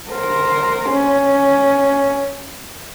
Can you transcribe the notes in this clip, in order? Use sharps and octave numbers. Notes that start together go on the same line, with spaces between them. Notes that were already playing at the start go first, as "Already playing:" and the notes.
A#4 C5
C#4